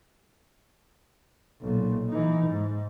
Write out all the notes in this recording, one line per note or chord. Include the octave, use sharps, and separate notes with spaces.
B1 A#2
E3 D#4
G#2